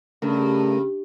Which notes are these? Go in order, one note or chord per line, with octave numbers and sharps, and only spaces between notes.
G2 C#3 A3 A#4